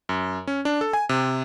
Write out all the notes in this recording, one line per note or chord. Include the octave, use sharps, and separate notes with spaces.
F#2
C#4
D4
A4
G#5
C3